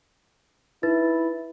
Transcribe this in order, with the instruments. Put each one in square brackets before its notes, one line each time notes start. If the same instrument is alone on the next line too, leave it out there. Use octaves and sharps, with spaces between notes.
[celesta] D#4 B4 A6 [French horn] E4